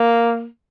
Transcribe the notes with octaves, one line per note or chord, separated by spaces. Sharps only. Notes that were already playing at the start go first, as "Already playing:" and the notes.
Already playing: A#3